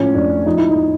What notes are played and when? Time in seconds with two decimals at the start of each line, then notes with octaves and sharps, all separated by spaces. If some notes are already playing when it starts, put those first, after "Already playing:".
Already playing: A2 F3 C#4
0.15 F2 D4
0.46 F3 D#4
0.57 E4
0.69 D#4